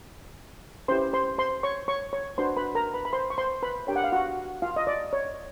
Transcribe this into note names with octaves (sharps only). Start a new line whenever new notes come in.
C#4 E4 G4 B4 C5 C6
C5 C6
C5 C6
C#5 C#6
C#5 C#6
C#5 C#6
D4 F#4 B4 C5 C6
B4 B5
A#4 A#5
B4 B5
B5
C5 C6
C#6
C5 C6
B4 B5
D4 G4 A#4 C#5 G5
F#5
F5
F#4 F#5
F4 F5
D#5
D5
C#5